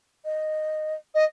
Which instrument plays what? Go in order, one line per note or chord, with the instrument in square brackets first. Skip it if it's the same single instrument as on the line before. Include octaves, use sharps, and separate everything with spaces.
[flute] D#5
[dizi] D#5